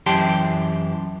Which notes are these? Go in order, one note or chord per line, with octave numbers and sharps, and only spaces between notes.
F#2 E3 G4 G5 A5 C6